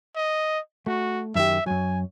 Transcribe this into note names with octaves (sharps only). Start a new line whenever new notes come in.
D#5
A3 F#4
F#2 D#3 G4 E5
F#2 F#3 G#5